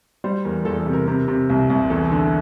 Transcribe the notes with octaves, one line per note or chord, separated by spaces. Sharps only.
G3 C5
E2 A#4
E2 A4
A4
C3
A#4
C3 A#4
C3
C2
C2
E2 A4
D3